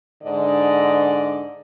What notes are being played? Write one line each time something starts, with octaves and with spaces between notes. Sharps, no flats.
G#2 D3 D5 D#5